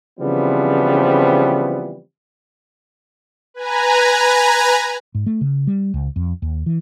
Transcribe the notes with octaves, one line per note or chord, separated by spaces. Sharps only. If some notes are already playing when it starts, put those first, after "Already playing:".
C#3 E3 F3 G3 B3 C4
B4 G#5 A#5
G#2
A3
C#3
G3
C#2
F2
D#2
E3